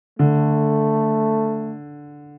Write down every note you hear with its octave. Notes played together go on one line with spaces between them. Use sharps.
D3 A3